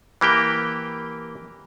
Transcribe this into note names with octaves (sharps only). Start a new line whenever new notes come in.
E3 A#3 G4 G5